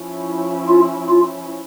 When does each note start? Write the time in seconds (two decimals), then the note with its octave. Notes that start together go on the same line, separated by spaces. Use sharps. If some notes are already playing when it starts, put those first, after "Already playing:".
Already playing: F3 C#4 E4
0.68 F4
1.09 F4